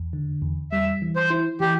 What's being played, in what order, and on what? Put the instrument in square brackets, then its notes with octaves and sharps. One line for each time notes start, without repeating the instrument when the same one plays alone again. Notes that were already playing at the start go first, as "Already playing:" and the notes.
Already playing: [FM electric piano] E2
D3
E2
[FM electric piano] G3 [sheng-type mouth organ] E5
[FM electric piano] E3
[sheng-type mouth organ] C5
[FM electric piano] E4
[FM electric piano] E3 [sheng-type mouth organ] G4